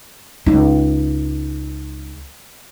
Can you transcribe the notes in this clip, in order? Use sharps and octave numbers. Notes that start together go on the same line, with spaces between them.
C#2 D#4